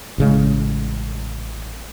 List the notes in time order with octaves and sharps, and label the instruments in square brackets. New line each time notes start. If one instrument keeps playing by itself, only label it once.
[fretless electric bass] A1 C#3 G#3